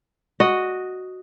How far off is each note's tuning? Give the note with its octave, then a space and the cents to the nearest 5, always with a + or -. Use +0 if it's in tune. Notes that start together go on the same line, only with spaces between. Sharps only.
F#4 +0 D#5 +0